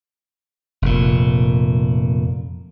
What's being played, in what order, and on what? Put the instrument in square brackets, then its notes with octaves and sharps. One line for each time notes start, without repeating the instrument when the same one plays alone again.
[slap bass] F1 A#2